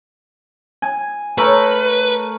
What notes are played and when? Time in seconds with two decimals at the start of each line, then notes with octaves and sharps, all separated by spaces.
0.82 G#5
1.38 A3 A#4 B4 C#5